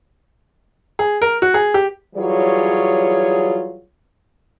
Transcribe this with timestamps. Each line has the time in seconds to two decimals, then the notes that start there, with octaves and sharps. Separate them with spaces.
0.99 G#4
1.22 A#4
1.42 F#4
1.54 G#4
1.74 G4
2.16 E3 F#3 G3 F4 G#4 C#5